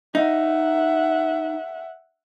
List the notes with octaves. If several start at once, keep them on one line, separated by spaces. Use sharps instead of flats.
D#4 E5 F#5